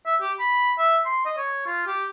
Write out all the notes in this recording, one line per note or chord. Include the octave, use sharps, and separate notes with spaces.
E5
G4
B5
E5
C6
D#5
C#5
F4
G4